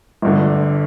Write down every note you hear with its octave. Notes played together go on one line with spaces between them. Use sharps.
G1 G2 D3